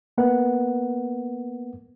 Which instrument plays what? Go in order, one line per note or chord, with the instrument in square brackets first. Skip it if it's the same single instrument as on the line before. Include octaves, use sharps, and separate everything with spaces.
[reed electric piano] A#3 B3 A#4 B4 F#5